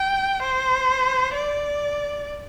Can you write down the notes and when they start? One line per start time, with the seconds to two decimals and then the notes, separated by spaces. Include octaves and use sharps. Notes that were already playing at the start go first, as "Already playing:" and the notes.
Already playing: G5
0.42 C5
1.35 D5